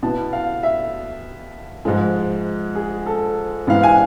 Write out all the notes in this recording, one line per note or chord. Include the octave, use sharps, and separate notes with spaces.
B2 B3 E4 A5
F5
E5
G#2 F3 G#3
G#4
A4
G#2 E3 B3 E4 F5
G#5